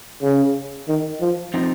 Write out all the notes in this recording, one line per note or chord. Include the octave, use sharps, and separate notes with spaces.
C#3
D#3
F3
F3 C4 D#4